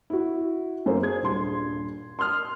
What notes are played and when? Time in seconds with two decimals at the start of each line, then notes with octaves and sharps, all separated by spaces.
0.10 E4 F#4
0.86 F#2 A#3 A4 C5
1.03 G#4 G#6
1.22 D#1 G2 C6
2.19 C6 D#6 F6